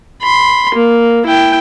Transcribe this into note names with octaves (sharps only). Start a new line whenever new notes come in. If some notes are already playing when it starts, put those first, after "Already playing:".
B5 C6
A#3
E4 G5